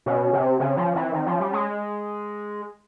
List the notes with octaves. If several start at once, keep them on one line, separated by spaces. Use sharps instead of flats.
B2 C#4
C#4
C3
C4
C#3 C4
F3 C#4
E3 C4
D#3 C4
F3 C#4
G3
G#3 C#4